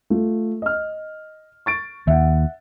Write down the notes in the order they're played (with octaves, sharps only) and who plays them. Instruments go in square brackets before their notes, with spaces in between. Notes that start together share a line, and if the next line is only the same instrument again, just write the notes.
[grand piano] A3 F4
D#5 F6
C#6 A6 D7
[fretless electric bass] D#2 [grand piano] E5 F#5